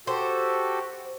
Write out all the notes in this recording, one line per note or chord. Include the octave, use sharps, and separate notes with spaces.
F#4 G4 A4 C5